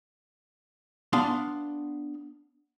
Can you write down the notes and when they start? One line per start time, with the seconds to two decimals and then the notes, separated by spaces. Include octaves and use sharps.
1.13 B3 D4 F5 C6